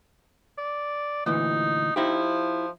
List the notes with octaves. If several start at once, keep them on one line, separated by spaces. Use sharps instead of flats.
D5
D2 A#2 E3 D#4
F3 D#4 E4 G4